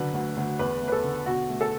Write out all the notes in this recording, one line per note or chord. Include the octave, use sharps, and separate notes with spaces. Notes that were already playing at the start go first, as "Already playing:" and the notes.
Already playing: D3 F#3 B4
D2
D2
E2 B4
A3
B4
A4
D3
B2 F#4
A3
A4